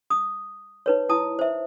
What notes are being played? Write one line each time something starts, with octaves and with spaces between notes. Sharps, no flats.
D#6
D#4 B4 C#5
E4 A5 D#6
C5 E5